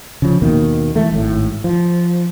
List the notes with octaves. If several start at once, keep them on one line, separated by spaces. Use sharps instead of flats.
C#3 F3
D#2 B2 D#3 A#3
E3 G#3 A3
G#1 A2
F3